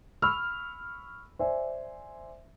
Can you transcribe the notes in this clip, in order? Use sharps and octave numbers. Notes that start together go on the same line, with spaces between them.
B5 C#6 E6 F6
C5 D5 E5 G#5